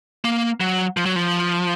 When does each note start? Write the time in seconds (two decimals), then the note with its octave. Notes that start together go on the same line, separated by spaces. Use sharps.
0.25 A#3
0.60 F#3
0.97 F3
1.06 F#3
1.16 F3